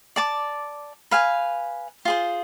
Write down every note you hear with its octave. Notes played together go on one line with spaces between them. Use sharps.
D5 A5 D6
B4 F5 G#5
F4 G#4 C5